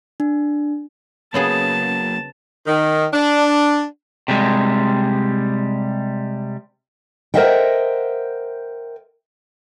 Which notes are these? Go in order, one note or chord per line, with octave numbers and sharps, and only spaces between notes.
D4
C#3 F#3 A#3 B3 G#4 A5
D#3
D4
C3 G3 G#3
A#4 C5 D#5 E5 F#5 G5